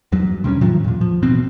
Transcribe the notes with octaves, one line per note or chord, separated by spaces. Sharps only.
E2 G2 F#3
C3 G3 A#3 C#4
A2 D#3 F3 F#3
E2 A#2
F3
D#1 A1 B2 C4